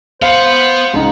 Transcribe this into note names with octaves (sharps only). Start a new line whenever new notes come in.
B3 C5 F5 F#5
C#2 D#4